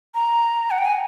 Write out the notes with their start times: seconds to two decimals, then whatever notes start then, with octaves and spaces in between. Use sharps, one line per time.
0.15 A#5
0.71 F#5
0.78 G5
0.85 G#5